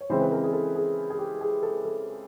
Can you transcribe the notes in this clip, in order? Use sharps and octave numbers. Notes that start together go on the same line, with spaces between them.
C#5
C#3 E3 G#3 C4 E4 C5
B4
A#4
G#4
A4
G#4
G#4
G4
G#4
A4
A4